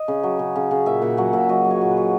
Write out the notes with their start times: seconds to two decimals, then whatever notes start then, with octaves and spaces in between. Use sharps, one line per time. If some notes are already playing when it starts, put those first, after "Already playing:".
Already playing: D#5
0.08 C#3
0.23 F#3
0.39 C#3
0.56 C#3
0.71 C#3
0.86 A#2 E5
1.02 A#2 F#5
1.17 F#3 F#5
1.33 A#2 E5
1.49 F#3 D#5
1.64 F#3
1.71 C#5
1.81 A#2
1.91 B4
1.97 F#3